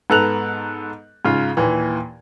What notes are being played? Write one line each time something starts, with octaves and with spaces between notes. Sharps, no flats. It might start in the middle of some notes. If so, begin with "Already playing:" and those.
G#2 B3 A4 A#5 F#6 F7
G#2 C#3 F4
D#2 A#2 E3